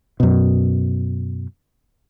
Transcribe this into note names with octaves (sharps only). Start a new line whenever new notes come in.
F#2 B2